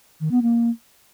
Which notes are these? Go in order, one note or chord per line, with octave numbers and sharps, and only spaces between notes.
D#3
B3
A#3